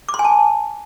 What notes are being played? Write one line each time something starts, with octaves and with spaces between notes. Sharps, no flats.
D6
C6
G#5
A5